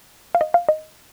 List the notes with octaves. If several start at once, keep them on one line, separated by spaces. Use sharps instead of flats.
F5
D#5
F5
D#5